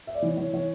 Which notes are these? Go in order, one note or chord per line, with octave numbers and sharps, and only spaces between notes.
E5
D5
E3 C#5
E3 C#5
E3 C#5